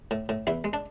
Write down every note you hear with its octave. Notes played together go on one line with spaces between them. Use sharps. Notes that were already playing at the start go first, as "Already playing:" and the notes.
A2
A2
E2 E4
G#3
D4